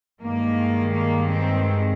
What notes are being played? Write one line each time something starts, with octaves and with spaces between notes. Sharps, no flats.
G2 D#3 G#3 A#3
A#3
C4